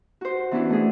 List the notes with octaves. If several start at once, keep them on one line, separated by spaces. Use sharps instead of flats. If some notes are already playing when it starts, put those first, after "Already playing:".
F#4 C5
E3 B3 C#4 D4 E4 F#4
A3 C#4 D4 G#4